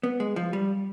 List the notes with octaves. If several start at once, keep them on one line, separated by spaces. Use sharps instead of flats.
B3
G#3
F3
G3